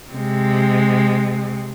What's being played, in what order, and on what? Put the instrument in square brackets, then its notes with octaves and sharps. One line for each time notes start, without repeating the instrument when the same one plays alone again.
[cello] C3 G#3